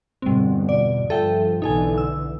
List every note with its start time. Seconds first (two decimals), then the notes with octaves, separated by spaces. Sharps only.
0.22 G1 E2 B2 G3 C4
0.69 D5
1.10 G2 F3 A4 E5 G5
1.62 B1 D3 E3 D#4 A4 G#5
1.98 E6